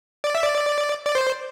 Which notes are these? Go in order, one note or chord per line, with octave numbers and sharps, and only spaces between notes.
D5
E5
D5
D5
C5